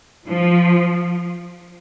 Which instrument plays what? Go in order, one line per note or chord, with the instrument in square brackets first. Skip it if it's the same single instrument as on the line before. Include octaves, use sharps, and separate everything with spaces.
[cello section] F3